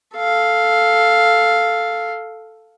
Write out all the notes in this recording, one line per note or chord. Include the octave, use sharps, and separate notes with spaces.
A4 F5